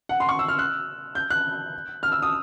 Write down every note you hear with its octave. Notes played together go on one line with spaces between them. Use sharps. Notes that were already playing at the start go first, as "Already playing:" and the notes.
F#5
C6
C#6
E6
F6
F#6
G6
F#6
F6
E6
D#6